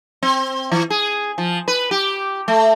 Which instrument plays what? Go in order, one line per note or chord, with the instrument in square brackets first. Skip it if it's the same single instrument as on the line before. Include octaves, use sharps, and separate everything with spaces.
[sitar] C4
E3
G#4
F3
B4
G4
A3